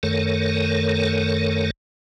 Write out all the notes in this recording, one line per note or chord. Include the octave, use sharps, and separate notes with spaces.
F#2 D#3 A3 A4 A#4 C#5